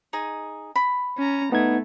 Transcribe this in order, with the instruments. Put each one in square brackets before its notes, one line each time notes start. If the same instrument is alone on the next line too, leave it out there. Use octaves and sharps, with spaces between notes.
[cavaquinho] D#4 G#4
B5
[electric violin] C#4 A#5
[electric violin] A3 [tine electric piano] B3 D#4 G#6